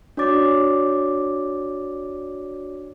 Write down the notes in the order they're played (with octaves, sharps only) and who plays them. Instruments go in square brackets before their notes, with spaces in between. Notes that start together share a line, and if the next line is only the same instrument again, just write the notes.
[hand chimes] D4 F#4 C#5 D5 D6 A6